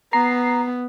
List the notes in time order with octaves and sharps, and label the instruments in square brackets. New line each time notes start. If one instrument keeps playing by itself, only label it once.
[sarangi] B3 [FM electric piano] A#5 C7